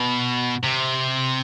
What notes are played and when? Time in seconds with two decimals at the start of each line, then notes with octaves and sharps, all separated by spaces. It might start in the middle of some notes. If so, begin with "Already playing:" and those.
Already playing: B2
0.64 C3